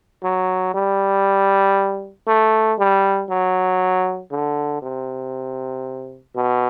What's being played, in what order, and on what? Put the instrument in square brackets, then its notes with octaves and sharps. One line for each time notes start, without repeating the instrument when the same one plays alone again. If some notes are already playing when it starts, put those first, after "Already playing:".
[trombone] F#3
G3
A3
G3
F#3
D3
C3
B2